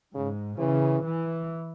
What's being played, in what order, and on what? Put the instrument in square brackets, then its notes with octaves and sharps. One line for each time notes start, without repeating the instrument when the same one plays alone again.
[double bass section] G#2 [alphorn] C#3
[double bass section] C#3 [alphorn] E3
[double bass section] E3